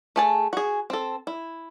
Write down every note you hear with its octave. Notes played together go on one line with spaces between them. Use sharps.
A3 G#4 A5
F#4 G#4
C4 A4
E4